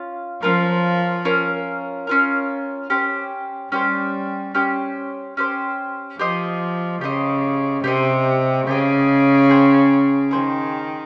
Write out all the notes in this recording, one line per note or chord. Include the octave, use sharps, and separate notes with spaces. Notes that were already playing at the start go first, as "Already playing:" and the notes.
Already playing: C#4 F4
F3 C#4 F4 A#4
C#4 F4 A#4
C#4 F4 A#4
C#4 G4 C5
G3 C#4 G4 C5
C#4 G4 C5
C#4 G4 C5
F3 G4 C5 D#5
C#3 G4 C5 D#5
C3 G4 C5 D#5
C#3 G4 C5 D#5
G#4 C5 G5
D#3 G#4 C5 G5